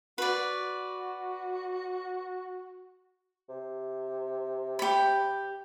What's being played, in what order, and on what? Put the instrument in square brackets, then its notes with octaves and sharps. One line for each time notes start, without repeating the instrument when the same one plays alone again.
[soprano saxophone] F#4 [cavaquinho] B4 D5
[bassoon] C3
[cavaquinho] G4 B5